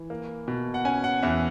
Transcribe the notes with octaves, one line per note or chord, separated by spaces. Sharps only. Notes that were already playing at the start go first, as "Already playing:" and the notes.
Already playing: E3
A#3
B2
F#5
C#4 G#5
F#5
E2 E5